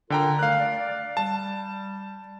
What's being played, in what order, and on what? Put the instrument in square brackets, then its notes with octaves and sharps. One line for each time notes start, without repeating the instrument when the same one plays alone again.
[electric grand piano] D3 G5 A#5 [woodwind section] F4 A4 A#4
[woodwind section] D#3 G3 A3 [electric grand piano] F5 F#6
[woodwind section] D5
[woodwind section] G3 [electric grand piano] A5